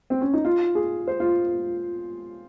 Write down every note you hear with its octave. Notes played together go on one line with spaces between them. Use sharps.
C4
C#4
D#4
F4
G#4
C5
F4